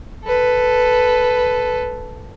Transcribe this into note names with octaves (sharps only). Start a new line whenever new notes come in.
A4 B4